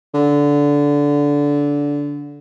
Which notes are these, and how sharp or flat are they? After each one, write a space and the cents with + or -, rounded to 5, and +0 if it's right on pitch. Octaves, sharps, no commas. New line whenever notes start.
D3 -20